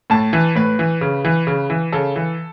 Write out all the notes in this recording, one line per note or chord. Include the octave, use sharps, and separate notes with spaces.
A2 A5
E3
A2 B4
E3
C#3
E3
C#3
E3
C#3 A4
E3